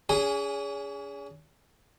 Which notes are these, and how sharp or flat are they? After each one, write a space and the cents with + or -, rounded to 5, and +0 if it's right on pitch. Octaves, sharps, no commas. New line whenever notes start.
C#4 +40 G#4 -10 G#5 +0